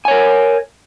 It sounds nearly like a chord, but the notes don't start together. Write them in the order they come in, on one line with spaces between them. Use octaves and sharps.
G#5 C#5 A#4